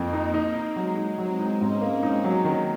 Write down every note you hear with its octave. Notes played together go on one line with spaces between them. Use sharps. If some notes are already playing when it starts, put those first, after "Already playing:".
Already playing: F2 A#3 C4
D#4
D#4
D#4
F#3 G#3
D#4
F#3 C4
D#4
G#2 C#4
A#3
D#4
F#3
D#3 A#3